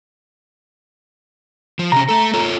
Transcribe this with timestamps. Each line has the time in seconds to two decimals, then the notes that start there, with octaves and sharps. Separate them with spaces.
1.79 F3
1.92 C3 C#4 A#5
2.09 A3 A4
2.33 F4 A4 C#5